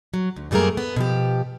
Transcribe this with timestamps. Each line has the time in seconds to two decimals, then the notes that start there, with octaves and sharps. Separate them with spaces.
0.14 F#3
0.36 D2
0.51 F#2 G3 A3 A#3 G#4 A#4
0.77 B3
0.96 B2 F3 G4